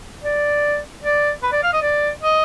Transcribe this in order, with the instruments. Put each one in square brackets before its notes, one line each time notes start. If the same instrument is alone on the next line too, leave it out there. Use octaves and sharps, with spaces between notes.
[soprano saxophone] D5
D5
B4
D5
F5
D#5
D5
D#5